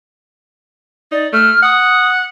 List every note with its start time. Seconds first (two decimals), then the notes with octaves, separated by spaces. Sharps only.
1.12 D#4 D5
1.33 A3 F6
1.63 F#5 D#6